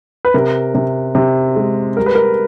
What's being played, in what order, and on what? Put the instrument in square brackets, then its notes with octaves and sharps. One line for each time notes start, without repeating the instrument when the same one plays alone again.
[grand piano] B4
C3 A#4
C3
C3
G#3
G3 A#4
B4
A#4